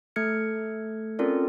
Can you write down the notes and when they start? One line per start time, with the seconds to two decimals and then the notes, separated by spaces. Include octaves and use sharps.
0.16 A3 A4 F6 G#6 C#7
1.19 C4 C#4 F4 A4 A#4 D5